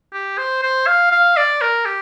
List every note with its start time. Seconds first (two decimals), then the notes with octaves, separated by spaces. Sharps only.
0.13 G4
0.38 C5
0.63 C5
0.87 F5
1.11 F5
1.37 D5
1.61 A#4
1.85 G4